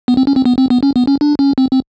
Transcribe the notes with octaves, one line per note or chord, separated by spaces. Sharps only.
B3
C4
C#4
C4
B3
C4
B3
C#4
B3
C#4
D4
C#4
C4
C4